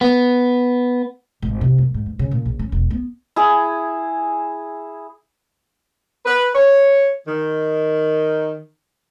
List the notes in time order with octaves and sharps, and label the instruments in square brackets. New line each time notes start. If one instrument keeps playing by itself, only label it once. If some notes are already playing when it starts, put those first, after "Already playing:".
[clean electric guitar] B3
[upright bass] G#1
C3
F#2
G#2
G2
C#3
A#2
A#1
C#4
E1
B3
[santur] E4 G#4
[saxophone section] B4
C#5
D#3